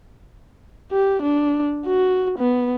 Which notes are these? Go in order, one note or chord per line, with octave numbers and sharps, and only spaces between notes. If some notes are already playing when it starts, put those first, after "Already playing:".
G4
D4
F#4
B3